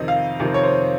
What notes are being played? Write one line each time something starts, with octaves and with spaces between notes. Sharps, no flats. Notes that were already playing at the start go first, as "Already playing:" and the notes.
Already playing: F2 C3 D#3 D#5
F5
F2 C3 D#3
C#5
C5